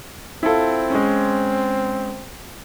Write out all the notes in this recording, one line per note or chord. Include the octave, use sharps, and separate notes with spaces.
C4 E4 F4 A4
G#3 C#4